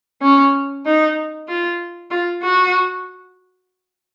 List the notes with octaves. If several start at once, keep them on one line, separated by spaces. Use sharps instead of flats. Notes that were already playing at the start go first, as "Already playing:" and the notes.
C#4
D#4
F4
F4
F#4